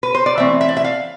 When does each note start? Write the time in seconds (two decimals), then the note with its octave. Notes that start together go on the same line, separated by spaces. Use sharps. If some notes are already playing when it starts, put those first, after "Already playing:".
0.03 B4
0.15 C5
0.26 D5
0.37 E3 A3 C4 E5
0.61 E5
0.69 D5
0.77 E5
0.84 F5